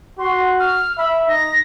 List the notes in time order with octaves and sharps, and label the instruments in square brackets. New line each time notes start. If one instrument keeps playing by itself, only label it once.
[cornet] F#4 [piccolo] C6
[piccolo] F6
[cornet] E5 [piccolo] B5
[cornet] D#4 [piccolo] A#6